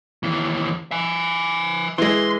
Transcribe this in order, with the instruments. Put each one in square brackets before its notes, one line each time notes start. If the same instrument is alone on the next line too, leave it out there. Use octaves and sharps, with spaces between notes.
[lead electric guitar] D#2 E3
E5 G#5
[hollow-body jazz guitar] E3 G#3 [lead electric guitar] C6